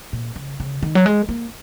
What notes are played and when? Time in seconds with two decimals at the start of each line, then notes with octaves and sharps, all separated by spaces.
0.13 A#2
0.36 C#3
0.60 C#3
0.82 D#3
0.95 F#3
1.06 G#3
1.29 A#3